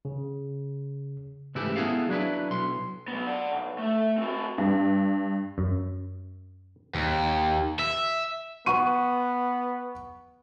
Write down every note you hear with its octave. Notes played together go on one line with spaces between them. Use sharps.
C#3
G#2 C#3 E3 A3 E4 G4
B3 E4 G#4 A4 F5
F#3 D4 E4 B4
B1 C6
F#3 B3
D5 F#5
B1
A3 A4
C4 F#4
G2
F#2
D#2
E5
B3 F#5 C#6 D#7